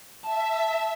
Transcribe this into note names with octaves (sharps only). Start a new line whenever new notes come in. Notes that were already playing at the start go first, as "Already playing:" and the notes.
E5 A5